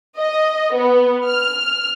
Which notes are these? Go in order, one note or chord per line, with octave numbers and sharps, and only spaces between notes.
D#5
B3
F6